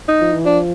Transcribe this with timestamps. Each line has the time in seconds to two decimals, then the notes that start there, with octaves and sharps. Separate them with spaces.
0.08 D#4
0.21 F3
0.33 E3
0.45 F3 D4